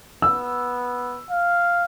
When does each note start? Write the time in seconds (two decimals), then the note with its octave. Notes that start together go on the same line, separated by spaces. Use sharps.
0.22 B3 E6
1.31 F5